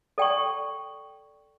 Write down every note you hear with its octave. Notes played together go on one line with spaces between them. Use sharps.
A4 D5 G5 A#5 C#6